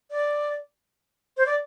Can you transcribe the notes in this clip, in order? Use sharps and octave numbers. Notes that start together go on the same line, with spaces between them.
D5
C5
D5